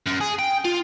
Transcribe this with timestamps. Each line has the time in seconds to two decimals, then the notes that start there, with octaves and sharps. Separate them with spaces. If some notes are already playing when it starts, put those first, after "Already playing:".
0.06 F#2
0.20 G#4
0.39 G5
0.65 F4